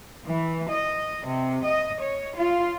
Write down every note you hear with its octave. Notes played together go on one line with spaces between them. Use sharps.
E3
D#5
C3
D#5
C#5
F4